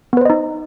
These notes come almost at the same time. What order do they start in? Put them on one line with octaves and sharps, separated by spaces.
B3 B4 C5 D#5 D#4